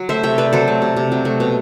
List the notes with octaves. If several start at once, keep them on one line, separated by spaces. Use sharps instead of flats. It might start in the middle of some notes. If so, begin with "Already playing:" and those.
Already playing: F#3
A3 C5 E5
C3 E5 G5
C3 B4 D5
F#3 A4 C5
A3
C3
C3
F#3
A3
B2